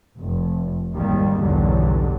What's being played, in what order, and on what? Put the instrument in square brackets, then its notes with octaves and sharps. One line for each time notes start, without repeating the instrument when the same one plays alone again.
[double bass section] F1
G#1 D#2 D#3 G3 A#3
B1 E2 G2 D3 F#3 G3